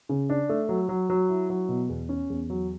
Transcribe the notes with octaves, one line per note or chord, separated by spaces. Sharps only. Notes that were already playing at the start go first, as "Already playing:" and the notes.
C#3
D4
A3
F#3
F#3
F#3
E4
F#3
B2
E2
C#4
E2
F#3